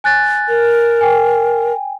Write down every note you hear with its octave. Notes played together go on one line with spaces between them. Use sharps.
G#5 F#6 A6
A#4
G5 G#5